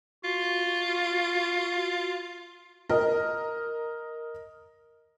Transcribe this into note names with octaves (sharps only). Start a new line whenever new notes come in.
F4 F#4
A#4 D#5